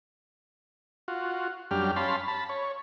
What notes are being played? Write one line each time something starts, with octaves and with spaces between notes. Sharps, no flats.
F4 F#4
F#2 G3 D4 G4 F6
C#4 F5 A5 B5 C6
A5 B5
C#5